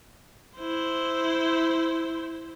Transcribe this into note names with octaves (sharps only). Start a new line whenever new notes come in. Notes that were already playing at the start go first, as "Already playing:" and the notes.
E4 C5